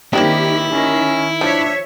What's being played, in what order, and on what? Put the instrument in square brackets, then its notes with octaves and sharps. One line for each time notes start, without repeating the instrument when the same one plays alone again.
[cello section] D#3 G4 [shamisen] A#3 C4 D4 [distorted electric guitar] E4
[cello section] D#3 [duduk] C#4
[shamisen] F3 [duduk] D4 [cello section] C#5 E5